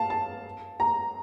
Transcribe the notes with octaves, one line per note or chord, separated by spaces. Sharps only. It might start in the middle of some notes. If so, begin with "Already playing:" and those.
Already playing: F5 A5
A5
A#5